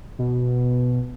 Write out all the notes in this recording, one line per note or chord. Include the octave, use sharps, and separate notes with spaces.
B2